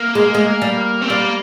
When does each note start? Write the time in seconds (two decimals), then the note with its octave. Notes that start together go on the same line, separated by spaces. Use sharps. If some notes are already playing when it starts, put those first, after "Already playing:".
Already playing: A#3
0.15 G#3
0.34 G#3
0.62 G3
1.02 C4
1.09 G3 A#3